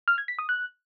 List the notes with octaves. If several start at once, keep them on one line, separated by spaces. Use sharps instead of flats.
F6
G#6
B6
D#6
F#6